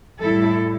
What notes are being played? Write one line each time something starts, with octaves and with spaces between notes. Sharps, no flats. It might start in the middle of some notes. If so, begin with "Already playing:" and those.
A2 G3 E4 A4